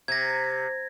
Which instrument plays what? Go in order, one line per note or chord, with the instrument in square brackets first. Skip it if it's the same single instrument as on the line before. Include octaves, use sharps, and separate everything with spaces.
[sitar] C3 [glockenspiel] G#6 A#6